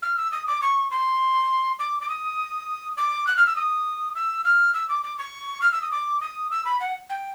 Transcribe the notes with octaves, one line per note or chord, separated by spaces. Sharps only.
F6
E6
D#6
D6
C#6
C6
D6
D6
D#6
D6
F#6
F6
E6
D#6
E6
F6
E6
D6
D6
C#6
F6
E6
D#6
D6
D#6
E6
B5
F#5
G5